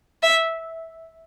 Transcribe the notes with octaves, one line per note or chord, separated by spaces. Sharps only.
E5